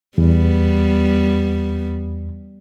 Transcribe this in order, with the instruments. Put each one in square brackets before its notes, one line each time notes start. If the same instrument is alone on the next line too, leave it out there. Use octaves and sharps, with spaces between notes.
[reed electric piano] E2 [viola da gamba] G3 B3